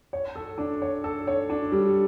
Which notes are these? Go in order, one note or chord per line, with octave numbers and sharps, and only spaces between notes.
C#5
A4
D4
C#5
A4
C#5
D4
G3